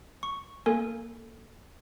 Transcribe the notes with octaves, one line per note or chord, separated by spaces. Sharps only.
C#6
A#3 A4 A#4 G#5